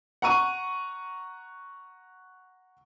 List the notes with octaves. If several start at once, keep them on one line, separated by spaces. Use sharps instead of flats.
F#5 A#5 C#6 D#7